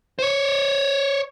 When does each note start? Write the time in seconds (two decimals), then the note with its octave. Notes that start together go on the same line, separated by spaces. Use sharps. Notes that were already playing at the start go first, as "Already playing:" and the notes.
0.19 C5 C#5